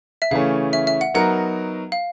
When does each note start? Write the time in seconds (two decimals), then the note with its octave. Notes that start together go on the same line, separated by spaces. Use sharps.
0.22 E5
0.31 C#3 E3 A3 C#4 F5
0.73 E5
0.87 E5
1.01 F#5
1.14 F#3 B3 D#4 F#4 A#4 F#5
1.92 F5